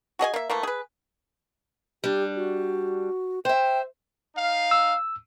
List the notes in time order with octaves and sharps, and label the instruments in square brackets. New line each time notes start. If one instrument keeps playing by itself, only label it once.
[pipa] F#4 G#4 D#5 G#5
A#3 E5
E3 A3 A#3
G#4 B4
[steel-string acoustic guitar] G3 D4 [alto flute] G4
[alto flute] F#4
[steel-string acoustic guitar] C5 E5 [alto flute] G5
[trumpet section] D#4 F5
[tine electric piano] E6